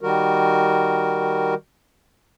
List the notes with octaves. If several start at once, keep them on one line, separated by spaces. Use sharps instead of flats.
D#3 G3 F#4 A#4